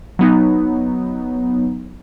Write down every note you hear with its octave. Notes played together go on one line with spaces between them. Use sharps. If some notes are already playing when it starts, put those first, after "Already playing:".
F#3 B3 D#4